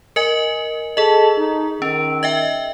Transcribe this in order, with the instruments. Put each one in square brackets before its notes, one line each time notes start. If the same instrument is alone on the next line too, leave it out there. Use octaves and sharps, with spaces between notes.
[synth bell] A#4 D#5 G#5
[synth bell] G#4 D#5 [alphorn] A4
[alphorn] D#4
[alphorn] D#3 [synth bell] C#4
[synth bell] D#5 E5 G5